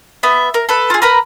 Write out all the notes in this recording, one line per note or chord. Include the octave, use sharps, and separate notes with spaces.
B3 E5
A#4
A4 B4
F4 G#4
A#4 B4 A#5 B5